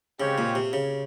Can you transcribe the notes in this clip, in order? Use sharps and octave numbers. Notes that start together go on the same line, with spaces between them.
C#3 G#3 C4 G4 C#5 F5
A#2
C3
C#3